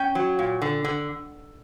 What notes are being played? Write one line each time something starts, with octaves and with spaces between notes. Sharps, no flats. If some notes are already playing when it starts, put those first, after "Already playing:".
Already playing: C#4 G5
F#3
A#2
D3
D3